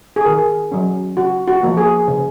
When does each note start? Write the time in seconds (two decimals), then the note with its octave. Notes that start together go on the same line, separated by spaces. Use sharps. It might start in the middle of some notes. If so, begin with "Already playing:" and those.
0.16 G#4
0.25 D#3 A#4
0.72 F#3 C#4
1.16 C#3 F#4
1.47 F#4
1.63 F3 A#3
1.77 G#4
2.08 C#3